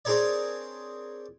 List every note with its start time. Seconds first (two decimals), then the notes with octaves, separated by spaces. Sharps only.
0.05 C4 D4 G#4 A#4 C#5 D5